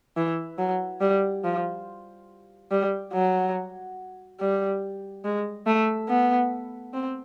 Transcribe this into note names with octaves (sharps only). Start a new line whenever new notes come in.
E3
F#3
G3
F3
G3
F#3
G3
G#3
A3
B3
C4